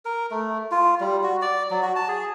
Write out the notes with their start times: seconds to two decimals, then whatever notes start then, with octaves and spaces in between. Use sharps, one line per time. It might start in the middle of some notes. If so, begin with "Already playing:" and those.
0.05 A#4
0.31 A3
0.71 F4
1.00 G3
1.23 F#4
1.42 D5
1.70 F#3
1.82 F#4
1.96 A5
2.08 G#4